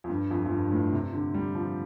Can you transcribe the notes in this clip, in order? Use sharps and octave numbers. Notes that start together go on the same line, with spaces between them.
F2
G2
F2
F2
G2
G2
A2
C3
D3
G3
F3